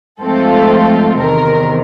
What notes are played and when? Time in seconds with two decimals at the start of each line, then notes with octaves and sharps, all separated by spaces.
0.20 G#2 F3 A3 C4 F4 A4
1.18 E2 C3 D#3 A#4